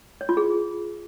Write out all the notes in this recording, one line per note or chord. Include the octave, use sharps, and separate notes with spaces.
C#5
F4
G#4